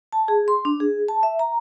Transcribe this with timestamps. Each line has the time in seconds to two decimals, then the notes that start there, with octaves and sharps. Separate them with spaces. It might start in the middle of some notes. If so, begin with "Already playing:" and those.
0.13 A5
0.28 G#4
0.48 C6
0.65 D4
0.80 G#4
1.08 A5
1.23 E5
1.39 A#5